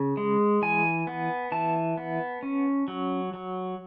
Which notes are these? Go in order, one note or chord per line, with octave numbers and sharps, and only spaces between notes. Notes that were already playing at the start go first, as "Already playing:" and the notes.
Already playing: C#3
G#3
E3 G#5
B3
E3 A5
B3
C#4
F#3
F#3